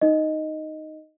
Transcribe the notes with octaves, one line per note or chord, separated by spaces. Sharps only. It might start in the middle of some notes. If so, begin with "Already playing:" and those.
D#4 D#5